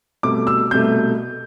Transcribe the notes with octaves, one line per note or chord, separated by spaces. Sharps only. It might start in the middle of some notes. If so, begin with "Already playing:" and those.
C2 B2 A3 D6
E6
C2 B2 A3 G6